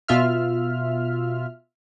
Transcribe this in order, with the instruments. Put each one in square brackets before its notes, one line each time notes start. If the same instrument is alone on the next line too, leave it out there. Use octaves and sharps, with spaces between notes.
[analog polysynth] B2 F4 E5 F6